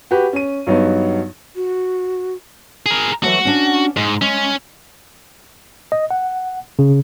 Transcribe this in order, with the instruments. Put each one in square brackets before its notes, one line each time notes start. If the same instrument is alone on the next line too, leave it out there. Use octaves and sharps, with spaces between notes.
[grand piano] F#4 G4 B4
C#4 D#7
G2 F#3 B3 D#4
[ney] F#4
[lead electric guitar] G#4 A#4
[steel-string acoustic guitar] E3 F#3 A3 [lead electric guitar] F#4
[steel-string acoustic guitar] C#4 D4 F#5
[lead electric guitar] G#2 [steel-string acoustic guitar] D#5
[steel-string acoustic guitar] G#3 [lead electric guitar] C#4
[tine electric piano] D#5
F#5
C#3